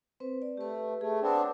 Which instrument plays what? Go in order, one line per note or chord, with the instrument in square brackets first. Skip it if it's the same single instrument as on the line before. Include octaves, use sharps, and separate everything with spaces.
[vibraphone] C4 B4 C5
D5
[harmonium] A3 [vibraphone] G4 B4
[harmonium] A3 [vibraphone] G#4
[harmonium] B3 C4 D4
[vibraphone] C#5 F#5 D6